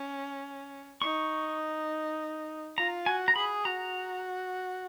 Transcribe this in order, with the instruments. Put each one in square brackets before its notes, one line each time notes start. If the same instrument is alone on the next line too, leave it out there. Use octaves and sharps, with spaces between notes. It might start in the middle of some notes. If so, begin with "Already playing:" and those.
Already playing: [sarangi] C#4
[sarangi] D#4 [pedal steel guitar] C#6
[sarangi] F4 [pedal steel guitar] A#5
[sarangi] F#4 [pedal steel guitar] G#5
[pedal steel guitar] A#5
[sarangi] G#4 [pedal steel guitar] B5
[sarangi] F#4 [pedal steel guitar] A#5